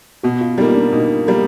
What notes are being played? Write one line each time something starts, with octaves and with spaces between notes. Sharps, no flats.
B2 F#4
F4
G3 A#3 D#4
D4
B2 D#4
G3 A#3